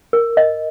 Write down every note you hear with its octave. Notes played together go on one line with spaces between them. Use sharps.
A#4
D#5